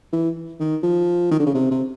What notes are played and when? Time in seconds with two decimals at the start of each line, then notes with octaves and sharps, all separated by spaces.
0.13 E3
0.60 D#3
0.83 F3
1.31 D#3
1.40 D3
1.46 C#3
1.54 C3
1.71 C3